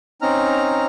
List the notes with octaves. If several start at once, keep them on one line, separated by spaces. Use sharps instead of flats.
C4 C#4 D#4 A#5 F6